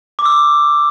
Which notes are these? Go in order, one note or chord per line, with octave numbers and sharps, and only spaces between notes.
D6
E6
D6